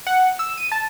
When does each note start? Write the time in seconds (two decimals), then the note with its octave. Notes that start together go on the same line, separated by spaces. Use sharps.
0.07 F#5
0.39 E6
0.58 D#7
0.72 A5